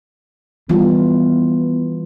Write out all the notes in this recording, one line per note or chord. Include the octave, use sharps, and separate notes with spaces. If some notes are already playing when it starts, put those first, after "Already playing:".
E3 G3 B3 F4